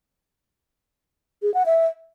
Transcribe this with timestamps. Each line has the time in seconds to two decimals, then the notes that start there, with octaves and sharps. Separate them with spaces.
1.42 G#4
1.54 F#5
1.66 E5